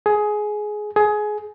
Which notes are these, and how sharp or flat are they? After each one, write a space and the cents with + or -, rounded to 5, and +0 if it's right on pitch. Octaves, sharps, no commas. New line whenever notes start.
G#4 +15
G#4 +20